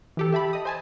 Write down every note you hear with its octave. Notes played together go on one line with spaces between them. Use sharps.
E3 G4 A4
G4 E5 A5 B5
D#5 D#6
C5 G#5 A5